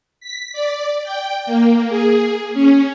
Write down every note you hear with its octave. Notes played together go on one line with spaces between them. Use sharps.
B6
D5
G5
A#3
G#4
C#4